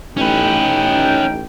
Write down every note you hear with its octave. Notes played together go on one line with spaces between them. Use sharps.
A1 C#4 D#4 B4 G5